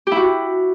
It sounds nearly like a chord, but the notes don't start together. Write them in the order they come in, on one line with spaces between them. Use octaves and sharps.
G4 E4 F#4